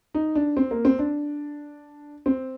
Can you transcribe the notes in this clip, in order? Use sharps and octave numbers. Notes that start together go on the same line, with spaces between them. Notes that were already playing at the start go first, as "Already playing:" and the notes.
D#4
D4
C4
A#3
C4
D4
C4